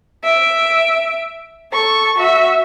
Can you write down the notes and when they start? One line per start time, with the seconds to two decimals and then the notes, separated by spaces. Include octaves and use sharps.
0.24 E5 D7
1.72 A4 C#6
2.18 F#4 E5